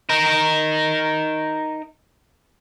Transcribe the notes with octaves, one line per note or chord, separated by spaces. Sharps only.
D#4 A#4